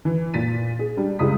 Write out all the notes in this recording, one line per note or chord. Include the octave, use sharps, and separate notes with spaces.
E3
A#2 A6 B6 D#7
G#4
G3 D4
C#2 G3 G#3 E4 D#6 B6